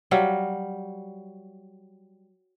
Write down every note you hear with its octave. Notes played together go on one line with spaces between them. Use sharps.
F#3 G3 F5